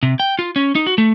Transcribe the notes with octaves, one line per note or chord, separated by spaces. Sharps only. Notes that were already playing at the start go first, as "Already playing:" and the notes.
C3
G5
F4
C#4
D#4
F#4
A3